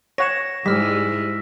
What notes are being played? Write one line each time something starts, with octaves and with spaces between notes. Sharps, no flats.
C#5 F#5 A#6 E7
G#2 G3 G#3 E4 E6 F6 B6